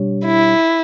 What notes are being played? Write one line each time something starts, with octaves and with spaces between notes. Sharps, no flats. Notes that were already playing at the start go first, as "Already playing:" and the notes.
Already playing: B2 G3 D4 G4 C#5
E4